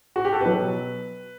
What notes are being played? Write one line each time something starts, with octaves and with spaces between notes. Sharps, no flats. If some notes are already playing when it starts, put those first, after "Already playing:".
F#4
G4
A4
B2 F#3 B4